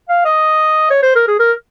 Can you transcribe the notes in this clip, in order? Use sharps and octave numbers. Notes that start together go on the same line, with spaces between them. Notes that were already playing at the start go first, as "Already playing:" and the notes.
F5
D#5
C#5
C5
A#4
G#4
A#4